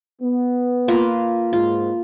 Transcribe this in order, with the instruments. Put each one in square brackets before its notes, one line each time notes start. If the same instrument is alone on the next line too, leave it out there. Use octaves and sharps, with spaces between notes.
[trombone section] B3
[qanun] A#3 F4 B4
[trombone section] G#2 [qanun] F4